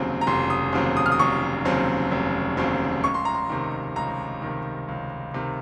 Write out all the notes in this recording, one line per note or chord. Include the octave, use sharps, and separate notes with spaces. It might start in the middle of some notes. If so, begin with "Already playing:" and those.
Already playing: F1 D#2 C#3 F#3 C4
A#5
F1 C6
D#6
D#2 C#3 F#3 C4
D#6
F6
D#6
F1 C#6
D#2 C#3 F#3 C4
F1
D#2 C#3 F#3 C4
C#2 C#6
C6
A#5
C6
C3 D#3
C#2 A#5
C3 D#3
C#2
C3 D#3